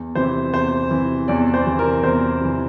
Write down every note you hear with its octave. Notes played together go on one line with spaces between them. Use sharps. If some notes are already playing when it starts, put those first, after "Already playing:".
Already playing: E2
C3 E3 C5
E2 C5
C3 E3
E2 D5
C5
C3 E3
A#4
E2 C5
C3 E3